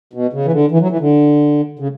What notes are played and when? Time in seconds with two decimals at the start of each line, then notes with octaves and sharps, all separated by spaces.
0.13 B2
0.33 C#3
0.45 E3
0.52 D3
0.71 E3
0.81 F#3
0.91 E3
1.01 D3
1.79 C#3